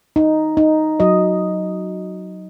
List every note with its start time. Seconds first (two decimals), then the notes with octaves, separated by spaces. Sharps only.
0.16 D#4
0.57 D#4
1.00 F#3 D#5